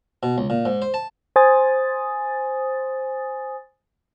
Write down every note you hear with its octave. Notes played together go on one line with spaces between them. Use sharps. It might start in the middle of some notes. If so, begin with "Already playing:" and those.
B2
C#2
A#2
G#2
C5
A5
C5 G#5 D#6 A6